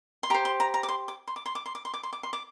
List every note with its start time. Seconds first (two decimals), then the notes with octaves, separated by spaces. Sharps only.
0.23 C6
0.30 G4 A#5
0.34 C5
0.45 C6
0.60 A#5
0.74 A#5
0.83 D6
0.88 C6
1.08 D6
1.28 C6
1.36 D6
1.46 C6
1.55 D6
1.66 C6
1.75 D6
1.85 C6
1.94 D6
2.03 C6
2.13 D6
2.23 C6
2.33 D6